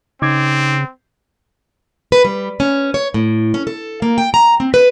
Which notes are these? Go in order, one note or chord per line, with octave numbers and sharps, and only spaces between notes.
C#3 C4 D#4 D6 G#6
B4
G3
C#4
C#5
A2
C#4
A4
A#3
G5
A#5
C4
B4